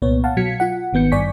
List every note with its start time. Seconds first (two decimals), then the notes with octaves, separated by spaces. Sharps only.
0.02 C2 A#2 B3 C#5
0.24 F5 F#5 A5
0.37 B2 F#3 G#6 B6 C#7
0.60 F4 F#5
0.93 G#1 D#3 B3 G6 C#7
1.12 G2 D5 G#5 C#6 B6